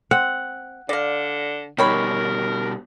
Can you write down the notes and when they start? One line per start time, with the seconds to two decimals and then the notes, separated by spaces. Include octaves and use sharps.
0.11 C4 F#5
0.89 D3 D5 F5
1.78 B2 D#3 G3 A#4 C#5 B5